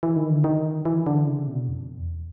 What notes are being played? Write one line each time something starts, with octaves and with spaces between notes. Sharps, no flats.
E3
D#3
D3
D#3
E3
D3
C#3
B2
F2
E2